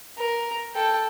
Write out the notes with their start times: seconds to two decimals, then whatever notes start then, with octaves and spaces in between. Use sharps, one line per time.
0.18 A#4
0.75 A4 G5